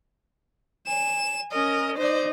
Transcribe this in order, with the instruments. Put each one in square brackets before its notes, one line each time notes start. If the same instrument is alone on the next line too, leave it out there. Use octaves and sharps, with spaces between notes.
[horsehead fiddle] G#5 [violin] E7
[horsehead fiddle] C#4 A#4 [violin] D#5
[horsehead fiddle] D#4 D#5 [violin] C5 D5